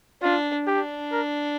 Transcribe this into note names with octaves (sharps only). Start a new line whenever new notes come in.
D4 F4
D4 G4
A#4